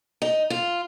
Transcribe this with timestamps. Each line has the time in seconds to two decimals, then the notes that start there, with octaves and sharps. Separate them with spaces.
0.22 D#4
0.50 F4